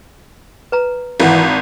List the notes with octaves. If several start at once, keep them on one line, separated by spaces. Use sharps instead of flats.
B4 A#5
G#1 E3 E4 F#5